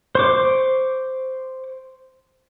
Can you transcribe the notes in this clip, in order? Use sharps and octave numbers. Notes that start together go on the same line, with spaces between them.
C5 C#6 D6